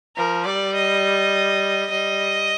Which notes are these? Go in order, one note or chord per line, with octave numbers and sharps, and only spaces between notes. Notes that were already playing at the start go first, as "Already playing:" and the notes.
F3 A#4
G3 D5
D#5
G3 D#5